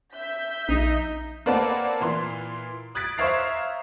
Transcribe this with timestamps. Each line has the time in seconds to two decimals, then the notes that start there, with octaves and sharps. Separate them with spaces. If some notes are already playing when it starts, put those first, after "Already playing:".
0.13 E5 G6 B6
0.69 A#1 D#4
1.46 A#3 C4 B4 D5 F#5 A5
2.01 A#2 E3 C6
2.95 D#6 F#6 G#6 A6 B6 D7
3.18 C5 C#5 E5 F5 A#5 C7